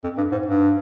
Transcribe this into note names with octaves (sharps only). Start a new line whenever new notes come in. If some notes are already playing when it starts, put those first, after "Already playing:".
F2
G2
G#2
G2